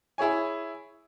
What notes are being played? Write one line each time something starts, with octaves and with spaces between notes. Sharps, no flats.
E4 G#4 C#5 G#5